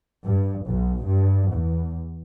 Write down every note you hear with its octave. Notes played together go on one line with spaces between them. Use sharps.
G2
B1
G2
E2